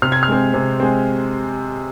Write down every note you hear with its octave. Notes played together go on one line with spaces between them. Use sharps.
C3 F6
G#6
F6
G#3 C4
C3
G#3 C4